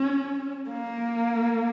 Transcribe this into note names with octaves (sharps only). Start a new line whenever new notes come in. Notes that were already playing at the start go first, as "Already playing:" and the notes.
Already playing: C#4
A#3